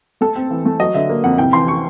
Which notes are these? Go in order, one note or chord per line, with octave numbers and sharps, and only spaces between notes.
A3 A4
C4
E3
A3
F#3 D#5
D3 E5
A#3
F2 F#5
C2 G5
E3 C6
C#6